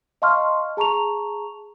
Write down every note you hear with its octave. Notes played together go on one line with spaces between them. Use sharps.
D#5 F5 A5 C6 C#6 F6
G#4 A5 A#5 C#6 F7